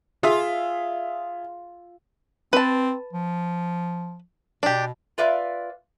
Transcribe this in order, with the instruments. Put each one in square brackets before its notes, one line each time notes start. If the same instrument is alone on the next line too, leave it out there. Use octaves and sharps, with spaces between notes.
[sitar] F4 [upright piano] G#4 E5
[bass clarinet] C4 [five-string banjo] B4 A5
[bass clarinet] F3
[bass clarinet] B2 [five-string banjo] D4 G4
[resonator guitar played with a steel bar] F4 B4 D5 E5 F5